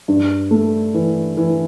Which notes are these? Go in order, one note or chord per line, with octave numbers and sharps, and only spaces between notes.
G2
A3
E3
E3